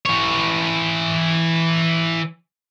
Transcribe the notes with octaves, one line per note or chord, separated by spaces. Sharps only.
E3 C#5